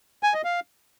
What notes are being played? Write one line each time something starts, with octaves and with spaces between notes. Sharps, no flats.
G#5
D#5
F5